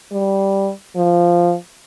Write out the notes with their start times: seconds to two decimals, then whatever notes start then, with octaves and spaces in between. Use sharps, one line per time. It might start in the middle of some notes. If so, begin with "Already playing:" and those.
0.12 G3
0.96 F3